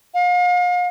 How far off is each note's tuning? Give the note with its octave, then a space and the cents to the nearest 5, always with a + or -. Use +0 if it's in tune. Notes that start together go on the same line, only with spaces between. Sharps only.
F5 +40